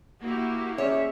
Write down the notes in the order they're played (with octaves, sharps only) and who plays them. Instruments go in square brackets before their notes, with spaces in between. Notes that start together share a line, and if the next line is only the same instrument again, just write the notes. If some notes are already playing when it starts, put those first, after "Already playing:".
[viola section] A#3 E4 G4 [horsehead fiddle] F#4
[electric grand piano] C#4 G#4 [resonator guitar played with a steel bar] C#5 [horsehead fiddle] E5